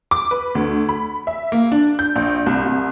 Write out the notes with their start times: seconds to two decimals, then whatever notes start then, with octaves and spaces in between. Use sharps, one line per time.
0.11 D6
0.31 B4
0.55 D2
0.89 B5
1.27 E5
1.52 A#3
1.72 D4
1.99 G6
2.16 A#1
2.46 C2
2.65 C2